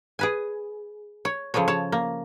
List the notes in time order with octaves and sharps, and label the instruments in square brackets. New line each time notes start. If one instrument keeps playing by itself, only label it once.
[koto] G#4 B4 G#5
C#5
C#3 F3 G#4 A4 C#5
C#5 A5
A#3